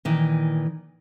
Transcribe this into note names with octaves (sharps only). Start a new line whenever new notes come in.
A#2 D#3 E3